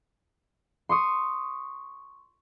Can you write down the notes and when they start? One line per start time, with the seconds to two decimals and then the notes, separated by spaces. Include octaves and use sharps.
0.89 C6 C#6 D#6